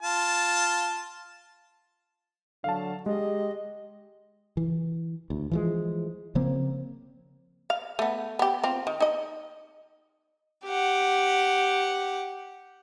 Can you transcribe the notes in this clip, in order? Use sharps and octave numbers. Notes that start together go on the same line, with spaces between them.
F4 A5
D3 F#3 F5 A5
G#3 G4 D#5
E3
D2
E3 F3 G#3
C#3 F3 A#3 C4
F5
A3 B3
B3 G4
C4 F4
D#3
D#4 D#5
G4 F#5